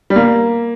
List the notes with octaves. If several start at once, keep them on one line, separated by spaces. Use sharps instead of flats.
G3
A#3